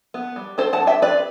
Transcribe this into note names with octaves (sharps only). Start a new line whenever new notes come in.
B3
G3
C4 A4 C5
F#5 A5
G3
E5 G5
C4 B4 D5